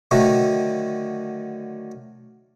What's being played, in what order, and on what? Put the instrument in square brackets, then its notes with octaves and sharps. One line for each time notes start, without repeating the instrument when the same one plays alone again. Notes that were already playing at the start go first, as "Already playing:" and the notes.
[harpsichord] D3 D#3 F#3 A3